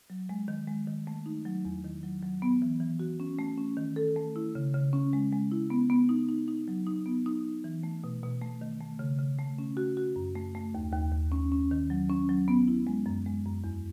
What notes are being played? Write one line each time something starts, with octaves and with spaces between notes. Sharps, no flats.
F#3
G#3
D#3
G#3
D#3
A3
D#4
F#3
E2
D#3
F#3
F#3
B3
E3
E3
F#4
C#4
A3
C#4
D#3
A4
A3
E4
C#3
C#3
C#4
G#3
G#3
E4
B3
B3
D#4
D#4
D#4
F#3
D#4
B3
D#4
D#4
E3
A3
B2
B2
A3
D#3
A3
C#3
C#3
A3
C#4
F#4
F#4
F#2
A3
A3
D#2
D#2
D#2
C#4
C#4
D#3
F#3
C#4
F#3
B3
E4
G#3
F#2
G#3
F#2
E2